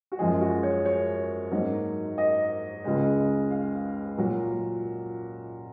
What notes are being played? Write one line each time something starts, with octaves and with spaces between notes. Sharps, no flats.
F#4
F#2 F3 G#3 G#4
F#4
C#5
C#5
G#2 F#3 A#3
D#5
C#2 C#3 G#3
F5
A#2 F#3 A#3